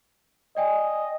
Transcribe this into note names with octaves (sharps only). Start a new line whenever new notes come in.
D5 D#5 G5 G#5